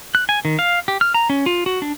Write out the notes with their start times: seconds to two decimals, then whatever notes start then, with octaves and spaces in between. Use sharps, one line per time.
0.15 F#6
0.29 G#5
0.45 D#3
0.59 F5
0.88 G4
1.01 F6
1.14 A#5
1.30 C#4
1.46 F4
1.66 F#4
1.82 D4